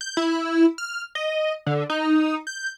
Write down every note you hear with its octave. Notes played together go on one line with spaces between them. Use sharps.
G6
E4
F6
D#5
D3
D#4
G6